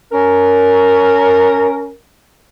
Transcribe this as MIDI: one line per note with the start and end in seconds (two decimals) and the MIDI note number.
0.12 1.91 61
0.12 1.91 70